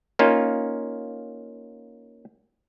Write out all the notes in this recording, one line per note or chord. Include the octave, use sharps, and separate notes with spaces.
A#3 C#4 D#4 F4